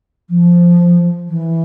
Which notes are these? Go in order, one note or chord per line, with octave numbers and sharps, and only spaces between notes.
F3
E3